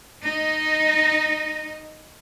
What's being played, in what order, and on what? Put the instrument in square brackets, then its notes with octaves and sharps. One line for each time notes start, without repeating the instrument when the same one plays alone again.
[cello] D#4 D#5